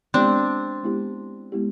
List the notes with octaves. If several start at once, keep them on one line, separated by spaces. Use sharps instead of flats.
G#3 B3 C4 D4 E4 G4
G#3 B3 E4 G4
G#3 B3 E4 G4